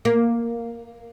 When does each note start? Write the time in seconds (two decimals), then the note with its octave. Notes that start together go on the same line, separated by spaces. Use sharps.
0.05 A#3